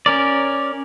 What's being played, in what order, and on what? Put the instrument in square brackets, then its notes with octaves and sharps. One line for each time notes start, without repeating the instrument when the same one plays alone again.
[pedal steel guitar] C#4 A#4 D5